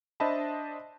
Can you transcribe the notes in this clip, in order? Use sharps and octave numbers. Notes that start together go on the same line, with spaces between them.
D4 C5 D#5 E5 A5 B5